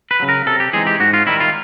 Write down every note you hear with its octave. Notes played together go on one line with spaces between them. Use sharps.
B4
C#3 F#3
A#4
C3 A4
G4
E3 G#3 C4 D#4 G#4
G4
G#2 F#4
F4
D#3 G3 E4
F4